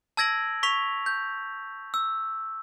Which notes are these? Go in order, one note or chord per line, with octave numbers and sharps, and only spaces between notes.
A5 E6 G#6 A#6 D7 F#7
C#6 B6 F7
G6
E6